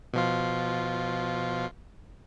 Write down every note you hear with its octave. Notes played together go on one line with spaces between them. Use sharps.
B2 F3 F4